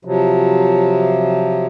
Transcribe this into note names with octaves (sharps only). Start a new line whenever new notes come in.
C3 F3 F#3